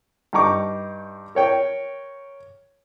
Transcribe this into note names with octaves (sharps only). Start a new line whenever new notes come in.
G2 D#4 A#5 C#6 D6
A#4 C#5 G5